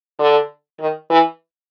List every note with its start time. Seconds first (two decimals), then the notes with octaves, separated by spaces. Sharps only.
0.19 D3
0.80 D#3
1.10 E3